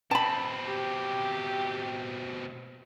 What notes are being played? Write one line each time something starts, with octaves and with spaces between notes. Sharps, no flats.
B2 C4 A5 B5
G4